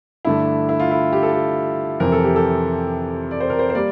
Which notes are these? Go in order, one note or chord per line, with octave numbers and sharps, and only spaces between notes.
G2 D3 A3 E4
E4
F4
E4
G4
A4
G4
F2 C3 E3 A#4
A4
G4
A4
D5
C5
A#4
C5
C5
G3 A#3 D5